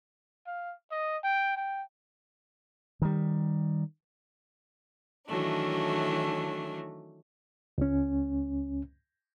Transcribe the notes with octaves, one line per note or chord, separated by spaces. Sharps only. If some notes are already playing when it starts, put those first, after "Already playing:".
F5
D#5
G5
G5
D#3 G3
D#3 E3 F#3 A3 D4
C#2 C#4